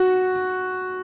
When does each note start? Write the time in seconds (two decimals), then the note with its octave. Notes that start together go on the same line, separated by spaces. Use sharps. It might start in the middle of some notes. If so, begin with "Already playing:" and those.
Already playing: F#4